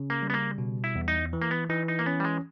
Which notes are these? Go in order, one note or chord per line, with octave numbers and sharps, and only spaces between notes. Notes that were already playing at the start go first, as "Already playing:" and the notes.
Already playing: C#3 C#4
A#3
G3
B3
A#3
B2
E4
E2
D#4
E3
A#3
B3
E3 D#4
D#4
A#3
B3 C#4
G3
G#3